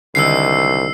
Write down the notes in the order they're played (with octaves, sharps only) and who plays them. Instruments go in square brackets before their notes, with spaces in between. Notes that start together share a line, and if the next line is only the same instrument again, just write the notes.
[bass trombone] C2 [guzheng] D3 D#3 G#3 [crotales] E6 C7